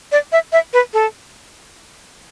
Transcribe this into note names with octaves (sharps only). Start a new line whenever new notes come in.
D5
E5
E5
B4
A4